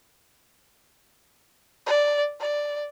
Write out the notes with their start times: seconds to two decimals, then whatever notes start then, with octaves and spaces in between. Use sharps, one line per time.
1.86 D5
2.40 D5